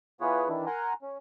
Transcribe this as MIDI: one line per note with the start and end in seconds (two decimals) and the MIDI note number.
0.21 0.48 52
0.21 0.48 59
0.21 0.48 65
0.21 0.48 68
0.21 0.48 71
0.21 0.48 73
0.48 0.66 51
0.48 0.66 52
0.48 0.66 62
0.48 0.66 64
0.66 0.93 70
0.66 0.93 78
0.66 0.93 80
0.66 0.93 82
0.66 0.93 84
1.02 1.18 61